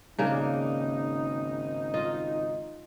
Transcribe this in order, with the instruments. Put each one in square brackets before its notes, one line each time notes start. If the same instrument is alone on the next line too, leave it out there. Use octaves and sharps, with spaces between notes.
[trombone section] G#1 D#4 [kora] C#3 A#3 D4
[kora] F4 D#5